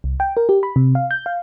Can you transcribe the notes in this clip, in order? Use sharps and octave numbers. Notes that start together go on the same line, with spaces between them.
C2
G5
A#4
G4
B5
C3
F5
G6
F5